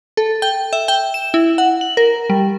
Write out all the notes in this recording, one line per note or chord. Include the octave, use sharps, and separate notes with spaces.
A4
G5
E5
G5
E7
E4
F#5
F#7
A#4
G3